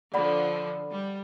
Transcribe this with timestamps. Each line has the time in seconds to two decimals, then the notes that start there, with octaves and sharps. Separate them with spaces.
0.14 D3 F3 D5 F#5 B5
0.92 G3